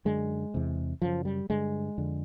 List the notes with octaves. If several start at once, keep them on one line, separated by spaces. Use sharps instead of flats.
F#2 D3 G#3
E2 C3
F#2 C#3 F3
G3
G2 D3 G#3
F2 D3